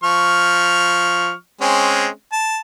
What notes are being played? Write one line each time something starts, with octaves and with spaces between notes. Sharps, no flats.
F3 C#6 F6
G#3 C4 C#4
A5